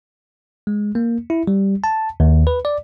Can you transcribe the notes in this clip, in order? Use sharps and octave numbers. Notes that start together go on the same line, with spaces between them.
G#3
A#3
E4
G3
A5
D#2
B4
D5